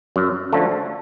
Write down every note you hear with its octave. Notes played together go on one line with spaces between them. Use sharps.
F#2
D3 F3 A3